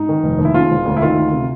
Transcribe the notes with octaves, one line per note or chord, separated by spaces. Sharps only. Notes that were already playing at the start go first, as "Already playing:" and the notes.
Already playing: G#2 D#4
D#3
F1
D#2
E4
C#3 F4
E1
D2
E4
D#3 F4
D2
C3